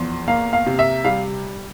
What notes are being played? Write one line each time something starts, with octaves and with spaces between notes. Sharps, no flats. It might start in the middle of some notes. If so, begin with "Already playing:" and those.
Already playing: E2 F3 C6
A#3 F5
F5
C3
E5
G3 F5